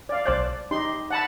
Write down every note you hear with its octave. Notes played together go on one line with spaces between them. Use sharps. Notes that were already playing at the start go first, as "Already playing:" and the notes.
D5 F5
B1 C5 D5 F#6
D#4 G4 C6
F#5 A5 B5